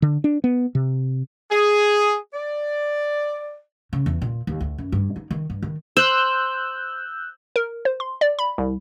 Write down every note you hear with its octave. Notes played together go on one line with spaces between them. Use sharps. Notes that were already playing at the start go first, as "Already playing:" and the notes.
D3
D4
B3
C3
G#4
D5
C#3
E2
A#2
D#2
D2
F#2
G2
D#4
D#3
G2
D#3
C5 E6 F#6 G6
A#4
C5
C6
D5
B5
C2